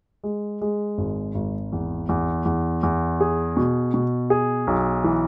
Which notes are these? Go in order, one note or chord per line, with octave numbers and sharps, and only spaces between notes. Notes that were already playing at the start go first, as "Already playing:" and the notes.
G#3
G#3
G#1
G#1
E2
E2
E2
E2
G#4
B2
B2
G#4
B1
E3